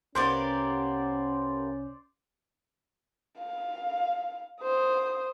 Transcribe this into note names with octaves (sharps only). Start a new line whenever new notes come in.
C2 A#3 B3 C#4 G4 C5 D5
F5
C5 D#6